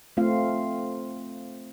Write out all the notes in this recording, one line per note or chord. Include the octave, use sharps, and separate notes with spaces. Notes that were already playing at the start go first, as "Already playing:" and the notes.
A3 C4 F4 F5